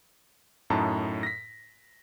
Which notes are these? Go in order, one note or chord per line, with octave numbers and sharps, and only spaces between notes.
F#2 A2 D#4 A5 A#5
A#6 B6